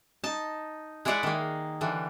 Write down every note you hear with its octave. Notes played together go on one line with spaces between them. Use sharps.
D#4 A5
G#3 E4 G#4 D5 F5 F#5
D#3 A#3
D3 E3 G3